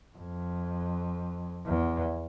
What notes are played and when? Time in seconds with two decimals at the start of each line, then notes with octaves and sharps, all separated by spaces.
0.17 F2
1.66 E2